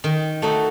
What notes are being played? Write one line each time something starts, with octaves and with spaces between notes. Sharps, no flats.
D#3
A3 D#4 F#4 A4